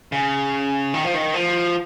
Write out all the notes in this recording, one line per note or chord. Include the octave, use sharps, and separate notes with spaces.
C#3
D#3
F3
D#3
F3